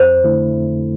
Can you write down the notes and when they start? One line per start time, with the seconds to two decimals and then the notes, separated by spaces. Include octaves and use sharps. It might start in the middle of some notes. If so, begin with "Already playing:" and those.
Already playing: F2 C5
0.24 D3 A3 E4
0.56 F2